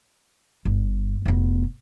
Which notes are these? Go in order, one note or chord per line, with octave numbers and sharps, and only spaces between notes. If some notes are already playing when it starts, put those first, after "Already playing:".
G1
F1 B3